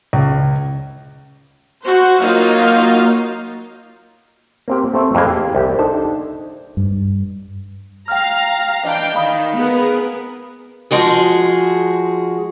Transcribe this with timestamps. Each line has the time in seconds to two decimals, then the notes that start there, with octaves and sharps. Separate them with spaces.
0.13 C#2
1.83 F#4 C5
2.18 F#3 A#3 D#4 F4 F#4 F5
4.68 A#3 C4 G4
4.94 A3 C4 E5
5.15 F2 E3 A#3 G#4
5.31 G4
5.55 C2 G4
5.79 D4 D#4 A4 C5 A5
6.77 G2
8.08 F5 G5 A#5 F6
8.85 E3 D4 D#5 G5
9.15 D#3 F5 B5 D#6
9.55 B3 G#4 A#4
10.91 F3 G#3 F#4 G#4